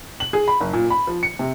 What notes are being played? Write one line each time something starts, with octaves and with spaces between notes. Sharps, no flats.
F#7
G#4
B5
F#1
A#2
B5
F3
C#7
C3